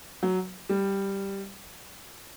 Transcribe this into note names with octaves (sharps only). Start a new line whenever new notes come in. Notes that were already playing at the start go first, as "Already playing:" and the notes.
F#3
G3